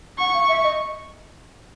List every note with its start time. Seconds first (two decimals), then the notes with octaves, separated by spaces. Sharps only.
0.19 F#5 C#6
0.34 F5
0.48 E5
0.64 D#5